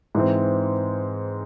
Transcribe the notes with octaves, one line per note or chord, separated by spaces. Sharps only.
G#2 E3 C4